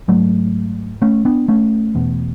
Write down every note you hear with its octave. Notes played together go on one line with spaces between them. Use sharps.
G#2 F#3 A3
A3 C#4
B3 D4
A3 C#4
E2 B2